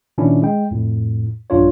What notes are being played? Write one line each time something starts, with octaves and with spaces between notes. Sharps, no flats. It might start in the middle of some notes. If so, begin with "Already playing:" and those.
A#2 D#3 C#4 D4 E4
G#3 G5
F2 A2
A#1 G2 D4 F4 C#5